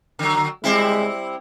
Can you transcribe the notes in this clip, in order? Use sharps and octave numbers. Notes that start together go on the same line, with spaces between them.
D3 F#3
G3 G#3 C4 E4